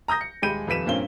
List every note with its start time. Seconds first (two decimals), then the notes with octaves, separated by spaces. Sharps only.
0.08 A#5 D#6 G6 A#6
0.21 C#7
0.42 D#1 G#3 G4 B5 G6 D#7
0.67 D#1 F2 B4 B6 D#7 E7
0.86 G2 A#2 A#3 C4 C#4 G7